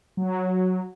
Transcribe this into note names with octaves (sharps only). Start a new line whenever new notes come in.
F#3